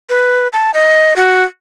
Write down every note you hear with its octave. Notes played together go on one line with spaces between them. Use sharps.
B4
A5
D#5
F#4